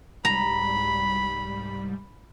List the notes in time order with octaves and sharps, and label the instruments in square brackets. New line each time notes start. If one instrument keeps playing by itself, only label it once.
[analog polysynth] C2 G#2 G3 [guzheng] A#5 [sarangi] B5